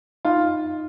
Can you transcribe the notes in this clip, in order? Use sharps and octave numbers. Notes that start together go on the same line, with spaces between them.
D#4 F4